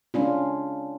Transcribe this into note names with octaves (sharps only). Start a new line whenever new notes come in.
G#3 C#4 D4 F4